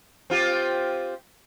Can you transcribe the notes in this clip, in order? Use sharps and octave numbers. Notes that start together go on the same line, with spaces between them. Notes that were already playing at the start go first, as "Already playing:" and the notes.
C4 F4 G4